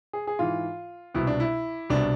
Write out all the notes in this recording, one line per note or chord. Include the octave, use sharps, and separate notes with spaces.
G#4
G#4
G#2 E3 F4
C2 B2 E4
D4
E4
C2 B2 D4